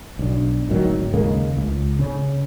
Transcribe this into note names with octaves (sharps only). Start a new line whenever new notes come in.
B1 D4
D1 G#1 D#3 F#3
D#2 C#3 G#3 A#3
C#2
C#3 C#4